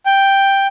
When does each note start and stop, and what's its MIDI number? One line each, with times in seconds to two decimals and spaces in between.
0.06 0.67 79